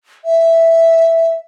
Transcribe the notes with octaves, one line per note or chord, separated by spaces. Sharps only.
E5